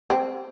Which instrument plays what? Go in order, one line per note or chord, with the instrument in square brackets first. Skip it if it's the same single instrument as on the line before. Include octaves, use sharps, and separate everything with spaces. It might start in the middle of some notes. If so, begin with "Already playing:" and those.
[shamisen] C4